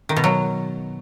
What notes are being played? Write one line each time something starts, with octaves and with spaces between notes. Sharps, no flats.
D#3
B2
F#3